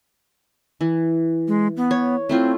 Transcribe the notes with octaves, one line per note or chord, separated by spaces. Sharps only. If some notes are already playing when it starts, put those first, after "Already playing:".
E3
G#3
B3
C#5
A3 C4 E4 F4